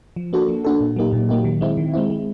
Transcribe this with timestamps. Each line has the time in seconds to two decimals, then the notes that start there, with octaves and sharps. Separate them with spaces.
0.16 F3
0.33 A#3 D4 F#4 A4
0.49 F3
0.65 A#3 D4 F#4 A4
0.81 A#2
0.96 F#3 A#3 D#4 G4
1.13 A#2
1.29 F#3 A#3 D#4 G4
1.45 D#3
1.61 G#3 C4 E4
1.77 D#3
1.94 G#3 C4 E4
2.10 G#3